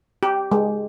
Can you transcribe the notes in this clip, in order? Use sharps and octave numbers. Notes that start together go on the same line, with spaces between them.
G4
G#3